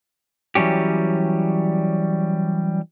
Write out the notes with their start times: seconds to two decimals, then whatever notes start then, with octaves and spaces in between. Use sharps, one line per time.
0.55 E3 F#3 G3 C#4 G4